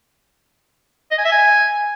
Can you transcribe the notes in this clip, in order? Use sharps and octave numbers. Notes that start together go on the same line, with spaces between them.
D#5
G#5
E5
G#5